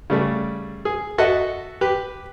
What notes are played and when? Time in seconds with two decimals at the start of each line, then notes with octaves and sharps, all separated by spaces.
0.10 C#3 G3 A3
0.85 G#4
1.18 F#4 A4 D#5 E5 F#5
1.81 G4 B4